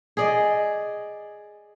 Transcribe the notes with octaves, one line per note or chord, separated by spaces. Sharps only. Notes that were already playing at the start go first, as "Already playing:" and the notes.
G#4 D5 D#5